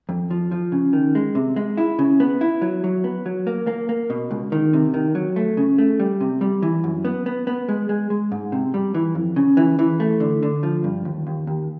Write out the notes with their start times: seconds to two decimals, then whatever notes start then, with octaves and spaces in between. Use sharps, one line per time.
0.09 F2
0.31 F3
0.52 F3
0.72 C#3
0.93 D#3
1.15 G#3
1.35 C3
1.56 G#3
1.77 E4
1.99 C#3
2.20 B3
2.41 E4
2.62 F#3
2.84 F#3
3.04 B3
3.26 F#3
3.47 A#3
3.67 A#3
3.89 A#3
4.10 B2
4.31 C#2
4.52 D#3
4.73 C3
4.94 D#3
5.15 F#3
5.36 A3
5.57 C#3
5.78 A3
6.00 G3
6.21 C3
6.41 G3
6.62 E3
6.84 F#2
7.05 B3
7.26 B3
7.47 B3
7.69 G#3
7.89 G#3
8.10 G#3
8.32 G#2
8.52 C3
8.74 G3
8.94 E3
9.15 F2
9.36 C#3
9.57 E3
9.79 E3
10.00 A3
10.20 D3
10.43 D3
10.63 F3
10.84 G2
11.05 D#2
11.27 D#2
11.47 D#2